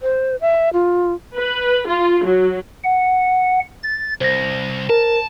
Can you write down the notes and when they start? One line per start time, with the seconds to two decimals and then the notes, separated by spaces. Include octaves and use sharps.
0.02 C5
0.41 E5
0.73 F4
1.35 B4
1.87 F4
2.24 F#3
2.84 F#5
3.83 A6
4.21 C2 C5 A#6
4.90 A#4 A5